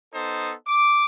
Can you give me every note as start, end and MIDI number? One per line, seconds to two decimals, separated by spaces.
0.14 0.54 59
0.14 0.54 63
0.14 0.54 69
0.14 0.54 72
0.68 1.04 86